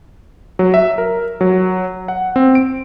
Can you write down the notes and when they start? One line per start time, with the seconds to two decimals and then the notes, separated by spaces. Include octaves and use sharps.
0.59 F#3
0.74 E5
0.98 A#4
1.41 F#3
2.08 F#5
2.36 C4
2.55 D7